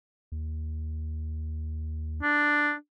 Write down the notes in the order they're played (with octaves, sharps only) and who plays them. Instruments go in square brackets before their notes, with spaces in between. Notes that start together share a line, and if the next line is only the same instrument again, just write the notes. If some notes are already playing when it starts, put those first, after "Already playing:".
[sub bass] D#2
[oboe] D4